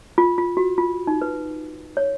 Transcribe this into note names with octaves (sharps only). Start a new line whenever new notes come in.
F4
F4
F#4
F4
D#4
B4
C#5